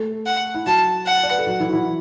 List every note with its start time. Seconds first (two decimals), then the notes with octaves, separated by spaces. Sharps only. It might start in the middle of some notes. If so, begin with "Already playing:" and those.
Already playing: A3 A4
0.26 F#5
0.55 E4
0.66 F#3 F#4 A5
1.07 F#5
1.23 D5
1.31 B4
1.39 A4
1.47 F#3 F#4
1.60 E3 E4
1.69 F#4
1.73 E3 E4